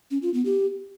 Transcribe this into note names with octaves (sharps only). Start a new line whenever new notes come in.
C#4
F4
B3
G4